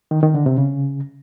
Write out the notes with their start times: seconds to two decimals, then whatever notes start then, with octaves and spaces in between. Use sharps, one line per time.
0.11 D#3
0.23 D#3
0.34 D3
0.46 C3
0.58 C#3